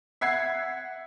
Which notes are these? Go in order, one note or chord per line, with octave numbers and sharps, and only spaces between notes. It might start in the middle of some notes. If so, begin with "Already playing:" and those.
E5 F#5 G#6 C7